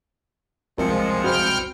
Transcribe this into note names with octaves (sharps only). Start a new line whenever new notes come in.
C2 F3 G#3 C4 A#4 C#7
F#4 C5 G5 B5 F6